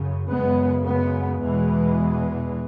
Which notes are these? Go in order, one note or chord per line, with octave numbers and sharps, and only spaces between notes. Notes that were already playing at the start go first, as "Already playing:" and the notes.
Already playing: F#2 C#3
F#2 C#3 G#3 B3
G#3 B3
E2 B2 E3 G#3